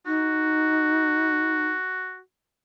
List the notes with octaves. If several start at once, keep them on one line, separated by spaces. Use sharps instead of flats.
D#4 F#4